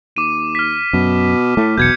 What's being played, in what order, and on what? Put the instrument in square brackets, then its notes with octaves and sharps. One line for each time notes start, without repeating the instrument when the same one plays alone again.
[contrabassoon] D#2 [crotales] D6 D#7
[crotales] F6 B6
[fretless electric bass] F#2 [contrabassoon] B2
[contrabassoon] A2 [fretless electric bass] A3
[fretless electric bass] E1 B1 [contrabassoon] B2 [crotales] G6 G#6 C#7